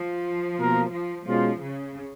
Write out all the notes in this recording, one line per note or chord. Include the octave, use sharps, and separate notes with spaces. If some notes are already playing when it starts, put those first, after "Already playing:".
Already playing: F3
B2 A#3 F4 A#4
F3
B2 F3 G#3 C#4 F4
C#3